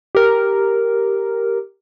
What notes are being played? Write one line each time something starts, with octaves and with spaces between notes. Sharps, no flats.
G4 A#4